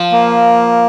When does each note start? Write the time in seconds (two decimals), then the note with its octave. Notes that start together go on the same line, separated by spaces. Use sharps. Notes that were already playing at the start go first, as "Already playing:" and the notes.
Already playing: F3
0.12 A#3